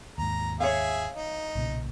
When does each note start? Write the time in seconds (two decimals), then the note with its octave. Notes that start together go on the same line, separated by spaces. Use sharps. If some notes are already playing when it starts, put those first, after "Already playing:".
0.18 D#2 G#2 A#5
0.60 G#4 C#5 E5 F5
1.15 D#4
1.55 B1 A#2 C#3